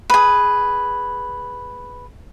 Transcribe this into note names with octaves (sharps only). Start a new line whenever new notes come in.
G#4 B4